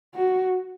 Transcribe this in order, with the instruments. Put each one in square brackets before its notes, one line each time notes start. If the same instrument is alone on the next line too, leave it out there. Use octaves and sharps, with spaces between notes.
[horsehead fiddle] F#4